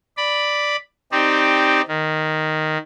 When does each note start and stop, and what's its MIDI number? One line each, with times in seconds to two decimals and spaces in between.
0.17 0.76 74
0.17 0.76 83
1.12 1.82 60
1.12 1.82 63
1.12 1.82 67
1.12 1.82 74
1.88 2.78 51